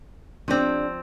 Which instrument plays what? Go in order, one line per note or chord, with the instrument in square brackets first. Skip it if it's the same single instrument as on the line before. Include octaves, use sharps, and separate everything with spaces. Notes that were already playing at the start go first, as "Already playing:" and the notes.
[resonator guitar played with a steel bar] F3 C4 [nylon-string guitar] D4 G4 D5